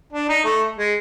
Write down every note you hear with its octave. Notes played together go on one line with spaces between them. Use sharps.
D4
D#4
A3
G#3